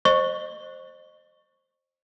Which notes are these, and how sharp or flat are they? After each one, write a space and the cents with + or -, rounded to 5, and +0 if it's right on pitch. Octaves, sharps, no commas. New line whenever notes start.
C5 +15 D#5 -30 C#6 +0